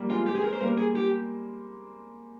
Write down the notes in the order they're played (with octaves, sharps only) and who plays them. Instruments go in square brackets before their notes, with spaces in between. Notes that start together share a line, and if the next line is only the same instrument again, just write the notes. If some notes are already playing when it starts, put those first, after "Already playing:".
Already playing: [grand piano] F3 G3 A#3
[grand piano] G#3 C4 [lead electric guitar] F4
[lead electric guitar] G4
G#4
A#4
C5
[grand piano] G3 A#3 [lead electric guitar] A#4
[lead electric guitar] G#4
G4